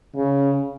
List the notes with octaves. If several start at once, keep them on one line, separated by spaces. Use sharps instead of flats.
C#3